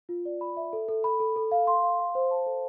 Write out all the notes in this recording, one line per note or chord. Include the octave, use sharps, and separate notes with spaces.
F4
D5
B5
E5
A4
A4
B5
A4
A4
F5
C6
F5
F5
C5
A5
A4